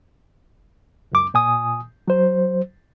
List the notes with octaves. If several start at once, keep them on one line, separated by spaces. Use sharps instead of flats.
C#2 F#2 D6
A#2 G#5 D#6
F#3 C5